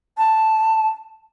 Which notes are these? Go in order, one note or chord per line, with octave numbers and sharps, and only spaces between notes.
A5